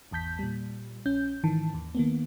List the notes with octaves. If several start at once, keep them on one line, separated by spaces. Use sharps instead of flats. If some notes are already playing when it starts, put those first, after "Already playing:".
G#1 E2 A5 G6 B6
A#2 G3
A#1 C#4 G6
G#2 D#3 E3 A5
D#2
D#3 A#3 B3